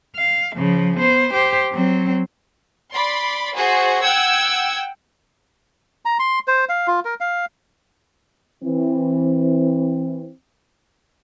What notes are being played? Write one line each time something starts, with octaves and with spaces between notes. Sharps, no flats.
F5
C#3 F3
B3 C5
G4 C5
F#3 C4
D5 B5 C6
F#4 G#4 C5
F#5 G5 E6 G6 G#6
A#5
C6
C5
F5
F4
A#4
F5
E3 C4